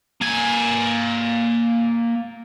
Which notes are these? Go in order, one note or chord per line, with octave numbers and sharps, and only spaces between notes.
A#3 G#5